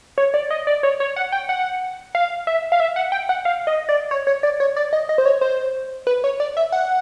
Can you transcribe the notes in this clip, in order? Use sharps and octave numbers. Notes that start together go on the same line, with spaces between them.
C#5
D5
D#5
D5
C#5
C#5
F#5
G5
F#5
F5
E5
F5
E5
F#5
G5
F#5
F5
D#5
D5
C#5
C#5
D5
C#5
D5
D#5
D#5
C5
C#5
C5
B4
C#5
D5
E5
F#5